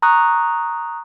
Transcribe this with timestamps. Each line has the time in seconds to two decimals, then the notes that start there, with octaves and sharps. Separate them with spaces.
0.02 A#5 C#6 D#6 F#6